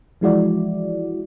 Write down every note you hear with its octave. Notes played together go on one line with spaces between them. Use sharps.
E3 F3 G#3 E4 F#4 D5